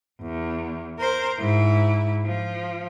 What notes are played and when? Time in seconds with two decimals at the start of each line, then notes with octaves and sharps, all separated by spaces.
0.22 E2
0.98 A#4 C5
1.39 G#2 E4
2.25 F3